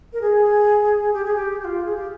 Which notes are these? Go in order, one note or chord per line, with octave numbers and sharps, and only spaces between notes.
A#4
G#4
G4
G#4
G4
G4
F4
G#4
G4